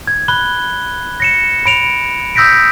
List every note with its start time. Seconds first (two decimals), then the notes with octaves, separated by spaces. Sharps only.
0.07 G#6
0.28 B5 F#6 G7
1.20 A#6 C#7 E7
1.66 B5 D7 F7
2.35 D#6 E6 G6 A#6 B6 D7